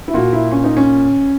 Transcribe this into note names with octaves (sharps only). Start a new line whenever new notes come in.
E4
A#2 F#4
E4
C#4
D#4
C#4